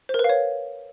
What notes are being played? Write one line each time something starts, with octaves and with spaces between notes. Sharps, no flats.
C5
A#4
B4
F5
C#5